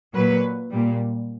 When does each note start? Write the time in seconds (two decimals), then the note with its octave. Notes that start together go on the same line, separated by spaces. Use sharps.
0.13 A#2 F#3 B4
0.70 A#2 G3